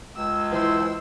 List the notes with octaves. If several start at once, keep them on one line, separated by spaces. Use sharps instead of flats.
C#2 E6
E3 E4 C5 E6